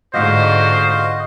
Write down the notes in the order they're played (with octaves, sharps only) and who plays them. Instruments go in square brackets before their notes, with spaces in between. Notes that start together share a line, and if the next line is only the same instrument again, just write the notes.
[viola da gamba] G#2 D3 [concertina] F4 F#4 F5 [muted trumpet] C5 [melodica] D#5